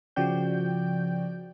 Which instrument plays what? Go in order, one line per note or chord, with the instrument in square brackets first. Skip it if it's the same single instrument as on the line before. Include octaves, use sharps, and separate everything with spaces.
[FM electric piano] C#3 F3 F#4 D5 G5 G6